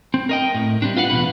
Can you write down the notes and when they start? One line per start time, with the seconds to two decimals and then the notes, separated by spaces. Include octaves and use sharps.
0.14 C4
0.29 A#4 D#5 G5
0.54 A2
0.82 G3 C4 D4
0.97 F4 B4 F5 F#5
1.10 E2 G#2 B2 B4